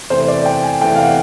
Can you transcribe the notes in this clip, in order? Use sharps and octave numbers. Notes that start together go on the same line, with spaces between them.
E2 C3 E3 A3 C5
D5
G5
G#5
E2 C3 E3 A3 G5
F5
F#5